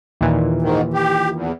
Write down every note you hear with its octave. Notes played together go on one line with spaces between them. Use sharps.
D#2 A#2 E3
G#2 D#3
G4
E2